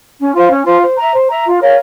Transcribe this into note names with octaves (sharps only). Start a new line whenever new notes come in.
C#4
F4 C5 F5
C#4
F4 C5 F5
C5
E5 A#5
C5
E5 A#5
F4
A#4 C#5 F5